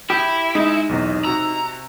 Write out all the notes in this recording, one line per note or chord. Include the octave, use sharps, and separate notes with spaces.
E4 G4
G#3 D#4
B1 E2 C3
C3 F#4 A#5 E6